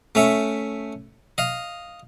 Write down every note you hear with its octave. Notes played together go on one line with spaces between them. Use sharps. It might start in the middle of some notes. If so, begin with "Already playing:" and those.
A3 C#4 E5
D#5 F5